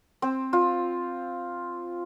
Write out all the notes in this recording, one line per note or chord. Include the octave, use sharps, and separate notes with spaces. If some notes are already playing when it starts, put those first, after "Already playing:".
C4
F4